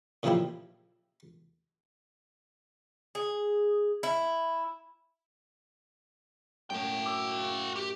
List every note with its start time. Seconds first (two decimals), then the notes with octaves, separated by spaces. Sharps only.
0.23 A#2 C#3 F3 A#3 E4 G4
3.15 G#4
4.03 E4
6.70 F#2 A2 F#4 G5
7.05 D6 E6
7.76 G4